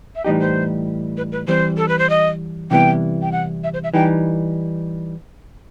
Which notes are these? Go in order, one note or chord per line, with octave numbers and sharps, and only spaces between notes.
E5
A2 E3 G3 D#4 G4 D#5
C5
B4
B4
E3 G3 C4 C5
A4
B4
C5
D#5
C3 E3 G3 B3 E4 G5
G5
F#5
E5
C5
E5
E3 G3 D#4 G5